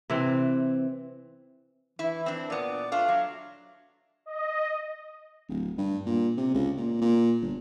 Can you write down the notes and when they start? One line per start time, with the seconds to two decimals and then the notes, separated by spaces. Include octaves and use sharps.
0.10 C3 E3 C4
1.99 E3 E4
2.26 C4 D4
2.50 A#2 B3 D5
2.92 A3 D4 F4 F5
3.08 F#3
4.26 D#5
5.49 D1
5.78 G2
6.06 A#2
6.37 C3
6.54 C#2
6.77 A#2
7.01 A#2
7.41 G1